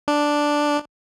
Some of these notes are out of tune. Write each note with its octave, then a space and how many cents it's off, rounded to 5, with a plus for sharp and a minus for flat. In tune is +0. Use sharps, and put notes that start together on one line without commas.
D4 +0